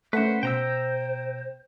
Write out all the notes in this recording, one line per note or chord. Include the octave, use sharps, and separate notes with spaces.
A3 C#4 B4 C5 F#5
B2 C5 G5 A#5 E6